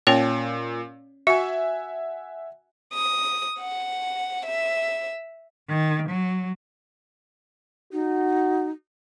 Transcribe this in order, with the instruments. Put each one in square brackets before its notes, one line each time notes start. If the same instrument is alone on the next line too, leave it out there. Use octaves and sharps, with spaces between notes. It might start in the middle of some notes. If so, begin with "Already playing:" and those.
[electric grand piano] A#2 [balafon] C#4 C#5 G5
[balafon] F#4 [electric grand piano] E5 F#5 G#5
[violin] D#6
F#5
E5
[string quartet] D#3
F#3
[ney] D#4 [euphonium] F#4